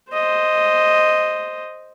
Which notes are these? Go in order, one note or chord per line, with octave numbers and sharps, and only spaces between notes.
C5 D#5